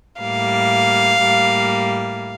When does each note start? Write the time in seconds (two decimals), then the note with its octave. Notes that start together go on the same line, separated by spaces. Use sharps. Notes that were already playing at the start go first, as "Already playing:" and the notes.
0.20 A2 G3 A#3 F5
1.22 A2 G3 A#3